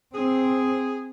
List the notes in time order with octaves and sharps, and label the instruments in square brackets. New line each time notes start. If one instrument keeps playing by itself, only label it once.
[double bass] C4 [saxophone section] G#4